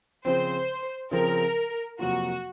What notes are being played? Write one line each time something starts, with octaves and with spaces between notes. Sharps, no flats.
C#3 F3 C4 C5
C#3 F3 C4 A#4
F2 C3 F#3 A#3 F4 F#4